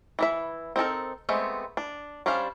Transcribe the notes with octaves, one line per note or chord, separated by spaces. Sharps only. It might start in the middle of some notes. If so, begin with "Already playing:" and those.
E3 E4 E5
C4 D#4 A4 A#4
G#3 A3 B3 C4
D4
G3 C#4 D4 C5 F5